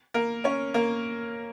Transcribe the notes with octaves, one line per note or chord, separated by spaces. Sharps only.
A#3 A#4
C#4 C#5
A#3 A#4